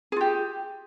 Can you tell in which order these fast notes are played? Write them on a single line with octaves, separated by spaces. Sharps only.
G#4 F4 G4